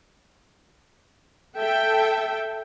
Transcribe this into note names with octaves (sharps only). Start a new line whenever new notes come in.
A4 E5 G5